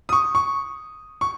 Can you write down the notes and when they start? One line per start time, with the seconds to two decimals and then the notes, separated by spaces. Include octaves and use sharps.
0.09 D#6
0.13 C#6
0.35 C#6
1.21 C#6